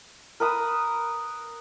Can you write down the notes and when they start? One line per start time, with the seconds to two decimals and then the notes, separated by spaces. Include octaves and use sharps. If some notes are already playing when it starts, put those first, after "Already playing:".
0.40 A#4 B4 D#6 E6